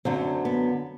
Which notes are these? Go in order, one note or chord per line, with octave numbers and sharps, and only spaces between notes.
F#2 D3 F#3 C4
B3